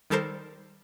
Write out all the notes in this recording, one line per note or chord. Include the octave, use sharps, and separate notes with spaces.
D#3 G3 A4 A#4 C5